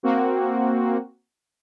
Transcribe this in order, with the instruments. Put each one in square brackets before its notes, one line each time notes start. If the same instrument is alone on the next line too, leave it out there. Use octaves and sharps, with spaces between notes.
[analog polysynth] A#3 C4 F#4